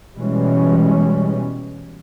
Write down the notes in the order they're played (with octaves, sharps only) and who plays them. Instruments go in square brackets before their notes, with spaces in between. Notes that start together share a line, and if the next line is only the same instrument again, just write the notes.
[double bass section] B2 E3 G3 G#3 C#4